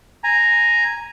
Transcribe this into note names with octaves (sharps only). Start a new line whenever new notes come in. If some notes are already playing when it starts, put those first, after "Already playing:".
G#5 A#5